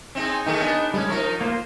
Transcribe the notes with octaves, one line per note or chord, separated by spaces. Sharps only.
C4 D#4 G#4
D#3 A3 D#4 G#4
B3 D4
G3 G#3 C#4 D#4
F3 D#4 A#4
A#3 F4 C5